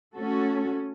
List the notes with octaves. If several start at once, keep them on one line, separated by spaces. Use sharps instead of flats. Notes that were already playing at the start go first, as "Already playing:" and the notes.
A3 C#4 F#4 A4